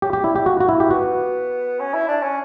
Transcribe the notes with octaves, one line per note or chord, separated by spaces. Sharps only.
F#3 G4
G4
G3 E4
G4
A#3 F#4
F#4
A#3 E4
G4
B3 F#4
C#4
E4
D4
C#4